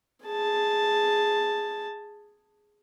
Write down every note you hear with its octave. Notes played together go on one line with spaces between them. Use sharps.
G#4 A5